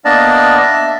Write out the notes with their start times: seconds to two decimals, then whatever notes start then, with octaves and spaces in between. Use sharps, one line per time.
0.05 A#3 B3 D4 D5 D#5 A5
0.63 E5